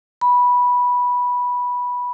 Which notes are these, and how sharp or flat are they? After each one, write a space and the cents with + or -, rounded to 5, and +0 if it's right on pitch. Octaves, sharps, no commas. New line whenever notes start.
B5 -10